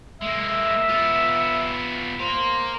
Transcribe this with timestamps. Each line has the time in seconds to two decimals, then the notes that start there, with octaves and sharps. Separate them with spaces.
0.21 G#3 A#3 E5
0.89 B3 F4
2.19 A#4 C5 F5